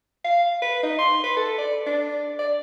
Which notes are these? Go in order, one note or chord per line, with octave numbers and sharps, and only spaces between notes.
F5
B4
D#4
C6
B4
A4
D5
D4
D5